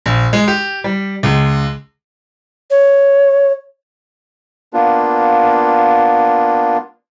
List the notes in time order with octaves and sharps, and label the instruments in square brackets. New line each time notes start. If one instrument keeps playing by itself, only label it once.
[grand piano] A#1
G#3
G4
G3
C#2
[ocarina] C#5
[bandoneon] A#3 B3 D4 F4